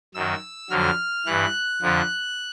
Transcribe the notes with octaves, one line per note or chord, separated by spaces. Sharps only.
F#2 D#3 F#3 E6
F2 D3 F#3 F6
G2 E3 F#6
F2 D3 F3